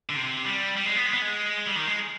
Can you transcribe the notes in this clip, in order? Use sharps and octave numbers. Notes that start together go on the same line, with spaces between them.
D3
C3
G3
G3
G#3
B3
G#3
B3
G#3
G3
D#3
G#3